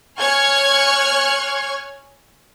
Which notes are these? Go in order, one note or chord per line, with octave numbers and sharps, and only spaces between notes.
C#5 G#5 C#6 F6 F#6 G#6